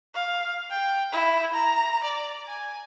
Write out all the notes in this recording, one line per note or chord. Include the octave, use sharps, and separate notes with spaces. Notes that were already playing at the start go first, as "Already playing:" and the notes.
F5
G5
E4
A#5
D5
G#5